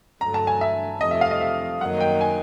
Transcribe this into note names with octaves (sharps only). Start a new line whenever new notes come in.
G2 D3 F#3 A3 A#5
A5
G#5
E5
F2 C3 F3 A3 D#5
E5
F5
D#5
E5
F#2 D#3 F#3 A#3 D#4 F#5
G5
G#5